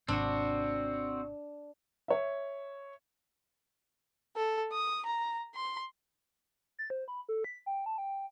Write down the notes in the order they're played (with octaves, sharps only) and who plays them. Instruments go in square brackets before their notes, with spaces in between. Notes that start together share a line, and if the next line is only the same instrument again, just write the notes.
[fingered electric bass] G#1 G#2 C3 [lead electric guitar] C4 F#4 [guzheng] D4
[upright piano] C#5 E5
[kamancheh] A4
D#6
A#5
C6
[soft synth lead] A6
C5
B5
A4
B6
G5
A5
G5